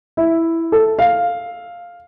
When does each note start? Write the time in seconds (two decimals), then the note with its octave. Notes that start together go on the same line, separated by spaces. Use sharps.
0.17 E4
0.72 A4
0.99 F5